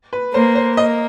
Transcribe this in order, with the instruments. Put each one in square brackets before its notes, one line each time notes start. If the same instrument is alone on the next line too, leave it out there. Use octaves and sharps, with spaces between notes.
[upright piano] B4
[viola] A#3 [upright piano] C5
[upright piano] C5
[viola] A#3 [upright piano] D#5